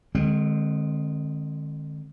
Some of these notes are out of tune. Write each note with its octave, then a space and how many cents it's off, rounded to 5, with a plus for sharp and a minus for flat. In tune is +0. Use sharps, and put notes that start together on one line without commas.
D3 +45 G#3 +0 C4 +25